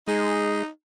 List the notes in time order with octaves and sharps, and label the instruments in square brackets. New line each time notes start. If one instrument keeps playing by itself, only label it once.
[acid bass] G#3 [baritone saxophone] D#4 [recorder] G#4